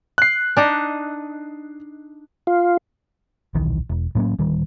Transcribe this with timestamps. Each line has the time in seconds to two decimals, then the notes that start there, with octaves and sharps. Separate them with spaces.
0.18 F#6 C7
0.57 D4 D#4 D#5
2.47 F4
3.55 D#1 B1 D#3 E3
3.89 E1
4.15 A2 F#3 A#3 C#4
4.39 D1 D#3 G3